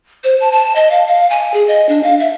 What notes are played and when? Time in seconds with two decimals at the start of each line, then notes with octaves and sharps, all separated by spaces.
0.24 C5
0.41 A5
0.52 A5
0.76 D#5
0.91 F5
1.08 F5
1.30 G#5
1.54 G#4
1.68 D#5
1.89 D4
2.03 F5
2.20 E5